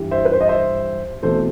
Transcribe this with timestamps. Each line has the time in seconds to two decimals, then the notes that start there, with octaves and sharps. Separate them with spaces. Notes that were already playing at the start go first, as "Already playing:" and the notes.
Already playing: G2 E3 G3
0.11 C5 E5
0.25 B4
0.33 C5
0.41 D#5
0.48 C5 E5
1.23 E2 B2 A3 C4 A4 C5